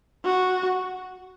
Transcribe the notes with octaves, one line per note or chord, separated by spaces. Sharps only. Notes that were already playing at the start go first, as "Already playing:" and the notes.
F#4